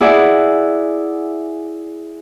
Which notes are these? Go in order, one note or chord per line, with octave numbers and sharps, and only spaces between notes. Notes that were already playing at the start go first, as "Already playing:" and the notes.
E4 G#4 D5 E5 F#5